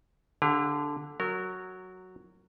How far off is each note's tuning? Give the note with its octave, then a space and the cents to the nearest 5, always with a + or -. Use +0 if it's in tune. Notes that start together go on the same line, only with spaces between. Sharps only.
D3 +0 G4 +40 F5 +0
F#3 +0 A#4 -25